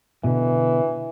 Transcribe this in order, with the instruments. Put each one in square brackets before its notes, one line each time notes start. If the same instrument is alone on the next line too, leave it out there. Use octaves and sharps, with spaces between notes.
[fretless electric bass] B2 D3 [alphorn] E3